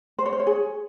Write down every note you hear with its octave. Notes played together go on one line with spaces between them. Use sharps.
C5
C#5
C5
C#5
G#4